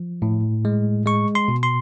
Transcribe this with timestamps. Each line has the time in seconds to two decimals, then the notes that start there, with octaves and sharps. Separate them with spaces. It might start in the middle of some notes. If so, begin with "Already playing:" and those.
Already playing: F3
0.22 A2
0.65 G#3
1.06 G#3 C#6
1.35 C6
1.48 B2
1.63 C6